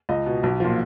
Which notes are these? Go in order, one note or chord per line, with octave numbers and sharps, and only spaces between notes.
C#2 D#5
B2
B1
A#2 F3